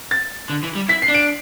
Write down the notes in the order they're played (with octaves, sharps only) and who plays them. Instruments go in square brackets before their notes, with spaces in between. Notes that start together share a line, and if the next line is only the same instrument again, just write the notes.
[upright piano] A6
[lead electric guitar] D3
E3
G3
[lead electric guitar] E4 [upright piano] B6
[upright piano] C7
[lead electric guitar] D4
[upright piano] D7